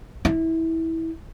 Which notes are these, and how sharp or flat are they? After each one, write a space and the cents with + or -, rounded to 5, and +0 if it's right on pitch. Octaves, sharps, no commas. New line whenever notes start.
E4 -20